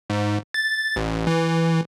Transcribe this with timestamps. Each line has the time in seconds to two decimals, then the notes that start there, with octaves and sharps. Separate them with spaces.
0.10 G#2
0.54 A6
0.96 A1
1.27 E3